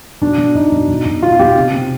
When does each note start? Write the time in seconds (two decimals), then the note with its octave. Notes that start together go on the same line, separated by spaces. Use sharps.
0.21 B2 D4
0.38 B2
0.55 B2 D#4
0.72 B2
0.88 B2
1.06 B2
1.22 B2 F4
1.39 B2 G4
1.56 C3
1.73 C3